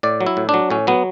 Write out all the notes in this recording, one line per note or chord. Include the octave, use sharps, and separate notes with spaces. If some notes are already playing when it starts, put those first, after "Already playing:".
A2 D5
F#3
E4
A2
F#3 D4
A2 C#4
F#3 B3